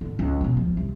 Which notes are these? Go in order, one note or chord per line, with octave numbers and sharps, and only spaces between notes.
G#2 D3
C#2 C#3
B2 G#3
D1 F3
C2